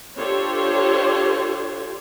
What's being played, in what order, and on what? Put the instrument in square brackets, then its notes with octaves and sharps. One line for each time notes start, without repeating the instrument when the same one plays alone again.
[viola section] D4 F4 G4 A4 C5 C#5